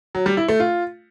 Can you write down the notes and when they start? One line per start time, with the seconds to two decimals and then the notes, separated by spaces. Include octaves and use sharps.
0.15 F#3
0.26 G3
0.37 E4
0.48 A3
0.60 F4